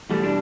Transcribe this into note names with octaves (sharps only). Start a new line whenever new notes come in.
E2 B2 G3 A3
D4